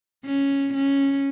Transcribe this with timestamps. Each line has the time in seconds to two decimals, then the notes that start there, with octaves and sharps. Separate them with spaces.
0.26 C#4
0.74 C#4